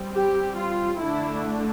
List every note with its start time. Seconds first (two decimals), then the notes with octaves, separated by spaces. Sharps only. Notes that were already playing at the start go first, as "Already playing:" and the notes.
Already playing: G3 C4
0.14 G4
0.57 F4
1.00 D3 A3 D4 E4